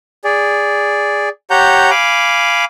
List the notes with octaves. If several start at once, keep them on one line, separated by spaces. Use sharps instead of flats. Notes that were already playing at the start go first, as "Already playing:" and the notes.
G#4 D5
G4 C#5 F#5 A#5 G6
F5 G#5 B5 D6